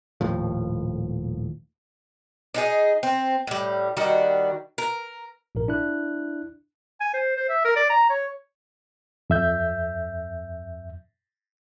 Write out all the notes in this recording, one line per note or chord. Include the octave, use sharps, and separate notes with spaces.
D#1 D#2 A2 F3
D4 D#4 G#4
C4
A2 G3
D#3 G3 D4 F#4
A#4
A#1 G#2 A#4
D4 E4 F#6
G#5
C5
C5
E5
A#4
D5
A#5
C#5
F2 E5 G6